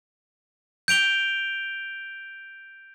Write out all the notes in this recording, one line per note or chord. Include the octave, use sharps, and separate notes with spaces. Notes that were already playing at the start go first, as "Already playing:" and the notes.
G6 D7 F7 G7